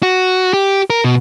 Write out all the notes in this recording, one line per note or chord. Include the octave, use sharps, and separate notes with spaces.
F#4
G4
A#4
B2